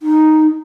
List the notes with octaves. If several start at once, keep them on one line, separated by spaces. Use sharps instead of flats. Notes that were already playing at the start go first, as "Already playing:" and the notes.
D#4